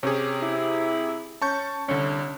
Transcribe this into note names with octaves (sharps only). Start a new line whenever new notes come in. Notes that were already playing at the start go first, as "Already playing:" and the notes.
C3 C#4 G4 G#4
E4
C#4 A5 C#6 G6
C2 D3 C#4